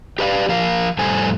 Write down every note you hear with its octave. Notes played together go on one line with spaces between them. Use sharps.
G4 B4 D5 F5
F3 A#4 F5
F2 A2 G3 A4 C5 G#5